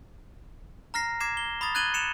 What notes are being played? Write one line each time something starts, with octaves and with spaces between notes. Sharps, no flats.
A#5 F6 A#6 C7
D6 G#6 C7 E7
G7
B5 D#6 A6
F#6 G#6 A6 D#7 F#7 G7
C#7 E7 F7